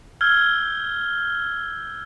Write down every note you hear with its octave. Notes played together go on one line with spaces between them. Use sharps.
E6 F6 G6 G#6 G7